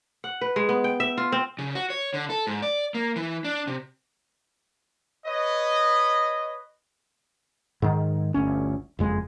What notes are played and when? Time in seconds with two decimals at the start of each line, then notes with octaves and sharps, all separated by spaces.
0.24 F#5
0.41 B4
0.56 G#3
0.69 B3
0.84 G5
1.00 E5
1.18 F4
1.32 C4
1.59 C#3
1.75 F#4
1.90 C#5
2.14 D3
2.30 A4
2.47 G#2
2.62 D5
2.94 A#3
3.16 E3
3.44 D4
3.67 C3
5.27 B4 C#5 D#5
7.82 G#2 D#3
8.34 G1 D2 C#4
8.99 F#1 F2 G#3